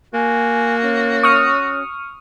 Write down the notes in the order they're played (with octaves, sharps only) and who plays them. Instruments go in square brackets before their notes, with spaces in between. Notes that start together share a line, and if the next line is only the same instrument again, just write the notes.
[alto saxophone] A#3 [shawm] F#4 [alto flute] G#5
[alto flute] C#4
[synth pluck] C#6 D#6 F6